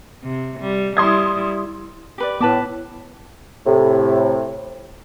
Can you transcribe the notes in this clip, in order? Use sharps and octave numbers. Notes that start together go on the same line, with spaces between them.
C3
G3
G3 E4 C6 D#6 G#6
G4 B4 D5
A2 B3 B4 A5 D6
A2 C3